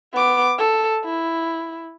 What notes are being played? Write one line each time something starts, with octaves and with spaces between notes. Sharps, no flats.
B3 D6
A4
E4